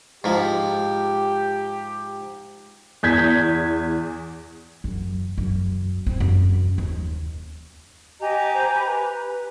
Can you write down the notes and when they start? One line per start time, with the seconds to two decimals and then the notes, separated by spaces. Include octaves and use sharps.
0.24 G#2 F3 G4
3.03 E2 G6 G#6 B6
4.84 F#2
5.38 F#2
6.06 C4
6.20 F#2
6.78 D#2
8.21 G4 D#5 G#5 A#5
8.54 C5
8.74 B5
8.87 B4